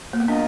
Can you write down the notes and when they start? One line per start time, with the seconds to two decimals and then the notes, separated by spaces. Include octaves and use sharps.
0.13 A#3
0.20 B3
0.28 D4 F4 A#4 D#5